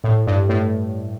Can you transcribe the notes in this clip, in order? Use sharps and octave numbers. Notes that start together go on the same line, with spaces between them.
A2
G2
A2